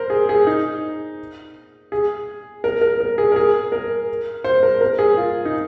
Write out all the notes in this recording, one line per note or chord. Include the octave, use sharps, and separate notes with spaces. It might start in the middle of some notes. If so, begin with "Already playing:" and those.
Already playing: A#4 C5
G#4
G#4
D#4
G#4
A#4
A#4
A#4
G#4
A#4
G#4
A#4
C5
A#4
A#4
G#4
F4
D#4